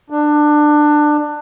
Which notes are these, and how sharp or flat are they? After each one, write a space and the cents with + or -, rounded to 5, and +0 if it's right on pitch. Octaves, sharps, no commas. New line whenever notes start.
D4 +20